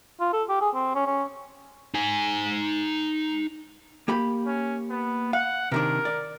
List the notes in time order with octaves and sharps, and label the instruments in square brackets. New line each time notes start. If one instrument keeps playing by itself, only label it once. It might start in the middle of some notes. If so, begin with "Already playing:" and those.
[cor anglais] F4
A4
G4
G#4
C4
C#4
C#4
[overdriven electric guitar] D#4 G#5
[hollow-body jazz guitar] A#3 G4 B5
[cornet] C#4
B3
[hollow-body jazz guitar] F5 [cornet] F#5
[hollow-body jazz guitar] C3 D#3 D4 [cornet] A#4
[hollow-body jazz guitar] D5